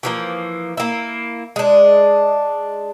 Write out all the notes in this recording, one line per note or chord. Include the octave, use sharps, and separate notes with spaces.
E3 F3 A#3
A#3 E4
G#3 D4